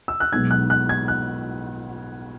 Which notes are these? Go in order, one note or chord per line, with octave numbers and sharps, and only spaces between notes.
E6
F#6
B1 B2 G#3 B3 D#4 G#6
F#6
F#6
G#6
F#6